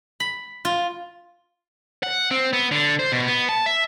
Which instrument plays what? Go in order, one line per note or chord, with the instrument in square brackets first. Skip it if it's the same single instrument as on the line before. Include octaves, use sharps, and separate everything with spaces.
[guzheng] B5
F4
[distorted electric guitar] F#5
C4
B3
D3
C5
B2
B3
A5
E5